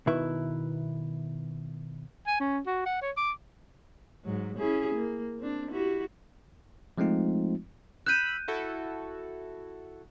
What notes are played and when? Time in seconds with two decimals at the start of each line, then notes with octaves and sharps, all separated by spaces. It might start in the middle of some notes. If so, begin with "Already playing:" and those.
0.07 B2 D#3 E4 B4 E5
2.27 G#5
2.40 C#4
2.66 F#4
2.86 F#5
3.02 C#5
3.17 D6
4.24 G#2 F#3
4.58 C#4 E4 G#4
4.95 A#3
5.39 C4 D4
5.71 E4 F#4 G4
6.98 F3 G#3 A3 C4 D#4 F4
8.06 B5 E6 F#6 G6 D#7
8.48 E4 F#4 A4